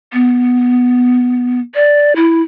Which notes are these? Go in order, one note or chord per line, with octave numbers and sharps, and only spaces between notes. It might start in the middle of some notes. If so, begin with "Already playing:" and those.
B3
D5
E4